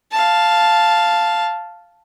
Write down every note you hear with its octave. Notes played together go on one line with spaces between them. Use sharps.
F5 A5